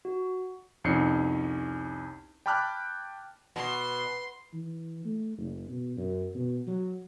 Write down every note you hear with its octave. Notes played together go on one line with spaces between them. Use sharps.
F#4
C2 F2 C#4 D#4 C7 C#7
G5 A5 B5 D6 F6 F#6
B2 C6
E3
A3
F#1
B2
F#2
B2
F#3